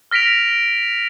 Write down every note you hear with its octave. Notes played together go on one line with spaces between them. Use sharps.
F6 A#6 B6 D7 F7